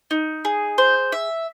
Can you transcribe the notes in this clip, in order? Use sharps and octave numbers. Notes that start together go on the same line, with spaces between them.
D#4
G#4
C5
E5